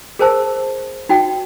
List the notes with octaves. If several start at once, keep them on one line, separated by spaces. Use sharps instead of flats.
G#4 A#4 C5 A5 E6
D#4 F#4 G5